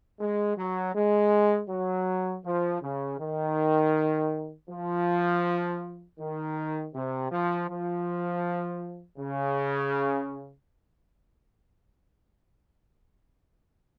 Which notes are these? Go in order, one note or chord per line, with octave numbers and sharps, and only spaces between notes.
G#3
F#3
G#3
F#3
F3
C#3
D#3
F3
D#3
C3
F3
F3
C#3